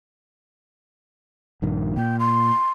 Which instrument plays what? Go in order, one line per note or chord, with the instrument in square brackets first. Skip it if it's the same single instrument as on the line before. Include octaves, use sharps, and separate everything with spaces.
[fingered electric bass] A#1 G2 D#3
[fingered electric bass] A#2 [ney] G5
[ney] C6